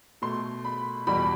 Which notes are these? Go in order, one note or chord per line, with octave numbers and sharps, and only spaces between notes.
B2 A3 C6
B5
E2 B2 G3 B5